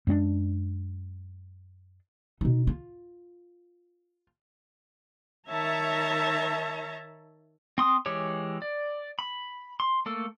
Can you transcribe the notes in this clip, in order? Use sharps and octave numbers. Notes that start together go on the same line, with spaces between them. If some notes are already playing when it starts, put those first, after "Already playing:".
F#2 G#3 C4 D4
B2 D#4
F4
D#3 C#5 E5 A5 A#5
C4 C6 D#6
E3 G#3 G4 C#5
D5
B5
C6
A3 A#3 A4